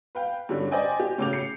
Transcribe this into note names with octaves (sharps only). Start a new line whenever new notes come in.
B4 F5 G5
G2 D3 G3 C#4
C5 D5 D#5 G5 G#5
G4
A2 C#3 F#4 D6 G6 F7
C7 C#7